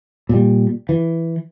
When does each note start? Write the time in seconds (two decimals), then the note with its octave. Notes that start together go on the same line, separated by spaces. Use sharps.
0.29 A#2 G3
0.89 E3